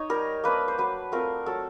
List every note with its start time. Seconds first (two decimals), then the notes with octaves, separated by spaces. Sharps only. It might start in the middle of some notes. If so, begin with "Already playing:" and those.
Already playing: D#4 C#5
0.10 G3 A#4
0.44 A#3 D4 B4
0.68 C5
0.78 F#3 B4
1.12 A3 C4 F4 A#4
1.46 F#3 A4